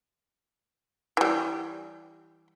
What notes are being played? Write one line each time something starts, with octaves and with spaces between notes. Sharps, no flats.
E3 G3